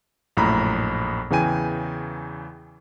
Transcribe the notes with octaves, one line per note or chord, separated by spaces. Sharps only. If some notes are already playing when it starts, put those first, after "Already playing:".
A#1 F#2 A2 A#5 B5
E2 C#3 E3 G5 G#5 D#7